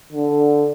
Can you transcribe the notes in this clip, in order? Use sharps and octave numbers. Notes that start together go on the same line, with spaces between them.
D3